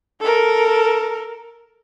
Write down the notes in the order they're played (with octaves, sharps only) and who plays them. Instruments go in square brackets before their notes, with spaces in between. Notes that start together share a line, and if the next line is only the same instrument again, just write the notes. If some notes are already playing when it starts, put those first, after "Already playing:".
[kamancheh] A4 A#4